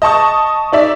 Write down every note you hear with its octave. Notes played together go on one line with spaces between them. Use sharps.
D#5 A5 C#6 D#6
D#4 D5 E5